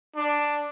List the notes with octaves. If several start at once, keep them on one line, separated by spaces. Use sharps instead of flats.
D4